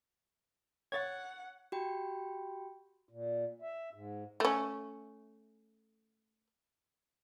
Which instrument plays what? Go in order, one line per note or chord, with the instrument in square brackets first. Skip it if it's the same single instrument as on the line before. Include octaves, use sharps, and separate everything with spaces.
[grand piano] C#5 [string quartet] F#5 [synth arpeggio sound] G#6 A6
[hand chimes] F#4 G4 G5 B5
[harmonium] A#2
E5
G#2
[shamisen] A3 C#4